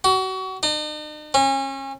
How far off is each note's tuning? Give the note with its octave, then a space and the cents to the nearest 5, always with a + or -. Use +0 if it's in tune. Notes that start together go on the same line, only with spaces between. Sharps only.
F#4 +30
D#4 -45
C#4 -35